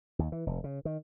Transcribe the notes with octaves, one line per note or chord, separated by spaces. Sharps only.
D#2
E3
F1
C#3
D#3